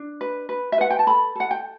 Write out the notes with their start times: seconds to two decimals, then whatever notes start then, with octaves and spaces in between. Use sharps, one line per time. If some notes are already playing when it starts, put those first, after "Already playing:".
Already playing: D4
0.21 B4
0.49 B4
0.72 E5
0.78 B4 F#5
0.91 G5
0.99 A5
1.07 A4 B5
1.35 A4 F#5
1.51 G5